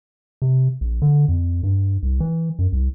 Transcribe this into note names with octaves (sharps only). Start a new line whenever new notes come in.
C3
A#1
D3
F2
G2
C2
E3
F#2
C2